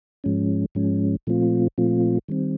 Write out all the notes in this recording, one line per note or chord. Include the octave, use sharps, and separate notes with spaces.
G#2 F3 G#3 C#4
G#2 F3 G#3 C#4
A#2 F3 A3 C4 F4
A#2 F3 A3 C4 F4
D#3 G3 C4